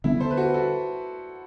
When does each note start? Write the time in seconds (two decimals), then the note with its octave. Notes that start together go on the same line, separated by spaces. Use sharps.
0.04 D3 G3 B3 D4 E4
0.21 A4 C5
0.31 B4
0.37 F#4 A4
0.54 F#4 A4